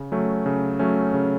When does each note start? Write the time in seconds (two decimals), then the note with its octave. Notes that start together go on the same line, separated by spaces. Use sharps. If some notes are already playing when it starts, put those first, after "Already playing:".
Already playing: C#3
0.12 F#3 A3 C#4
0.46 C#3
0.79 F#3 A3 C#4
1.14 C#3